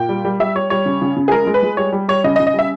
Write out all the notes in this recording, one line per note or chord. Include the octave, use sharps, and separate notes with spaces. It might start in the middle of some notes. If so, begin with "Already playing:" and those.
Already playing: A#2 G5
G3
G3
G3 E5
G3 C#5
G3 C#5
C#3
C#3
C#3
G#4
G#3 A#4
G#3
B4
G#3
G3 C#5
G3
G3 C#5
C#3 D#5
D#5
C#3
D#5
G3 E5